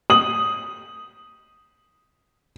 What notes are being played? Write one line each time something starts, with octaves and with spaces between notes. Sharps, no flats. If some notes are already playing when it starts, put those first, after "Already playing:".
D#6 F#7